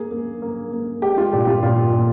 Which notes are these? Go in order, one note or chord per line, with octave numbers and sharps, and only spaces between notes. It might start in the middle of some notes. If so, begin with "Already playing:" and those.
Already playing: A#3 G#4
A#3
A#3
A#3
G#3 G4
F4
A#2 G4
F4
A#2 F4
A#2